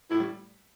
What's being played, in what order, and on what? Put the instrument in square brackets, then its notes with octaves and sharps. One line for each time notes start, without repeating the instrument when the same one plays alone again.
[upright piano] A2 A3 [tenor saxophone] E4
[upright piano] G3